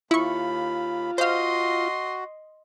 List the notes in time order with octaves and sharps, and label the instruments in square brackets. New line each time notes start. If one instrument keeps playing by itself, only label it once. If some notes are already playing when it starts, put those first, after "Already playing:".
[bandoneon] D#2 B5 [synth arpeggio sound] E4 C#6 [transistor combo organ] F4
[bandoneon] F#4 [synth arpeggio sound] C5 F5 [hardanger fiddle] D#5 C6